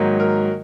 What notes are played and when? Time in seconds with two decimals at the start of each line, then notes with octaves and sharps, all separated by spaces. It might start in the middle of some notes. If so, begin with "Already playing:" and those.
Already playing: G#2 D#3 F#3 A#3
0.20 A#4